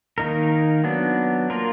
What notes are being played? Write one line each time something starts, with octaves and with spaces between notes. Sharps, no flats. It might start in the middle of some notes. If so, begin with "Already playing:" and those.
D#3 A#3 D#4 A#4
F#3 B3 D4
A#3 F4 A#4